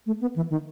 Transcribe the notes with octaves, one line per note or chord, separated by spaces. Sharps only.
A3
B3
E3
D#3